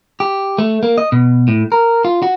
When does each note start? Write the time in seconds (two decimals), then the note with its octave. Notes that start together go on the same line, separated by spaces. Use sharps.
0.20 G4
0.58 A3
0.83 A#3
0.98 D#5
1.12 B2
1.48 A2
1.72 A#4
2.05 F4
2.22 F#4